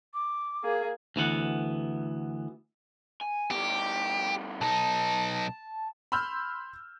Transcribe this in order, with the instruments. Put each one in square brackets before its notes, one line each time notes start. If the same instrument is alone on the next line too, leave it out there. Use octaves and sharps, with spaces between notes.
[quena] D6
[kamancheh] A#3 G#4
[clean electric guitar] D2 E3 B3 F#5
[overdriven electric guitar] G#5
[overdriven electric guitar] B2 G3 [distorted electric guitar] G4
[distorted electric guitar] B1 D#4 [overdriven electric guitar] A5
[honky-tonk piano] B5 C6 E6 F6 G6